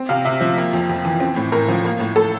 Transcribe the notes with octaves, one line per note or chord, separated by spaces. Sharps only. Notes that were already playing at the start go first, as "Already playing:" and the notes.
Already playing: C4
C3 F5
C3 E5
F3
A#3
F2
F2
E3
C4
A2
A2 A#4
F3
A#3
A2
A2 A4